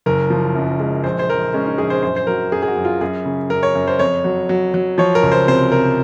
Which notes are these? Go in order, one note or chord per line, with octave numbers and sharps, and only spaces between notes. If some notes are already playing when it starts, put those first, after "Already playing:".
F#1 A#4
F3
F#2
G#3
A#1 C5
C5
A#1 A#4
G#3 C#4
D#4
A#1 G#4
C5
F#2 C5
C5
F#3 A#4
F#2 G#4
G#4
F#4
F#2
F4
F#2 G#4
C#3
F#2 A#4
C#5
F#2
C5
F2 C#5
F#3
F#3
F#3
F3 C#5
A#4
C#2
C5
C3 C5
C3 A#4